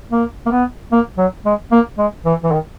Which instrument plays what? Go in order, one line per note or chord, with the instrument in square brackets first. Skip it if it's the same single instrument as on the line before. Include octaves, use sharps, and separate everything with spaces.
[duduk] A#3
A#3
B3
A#3
F#3
G#3
A#3
G#3
E3
E3
D#3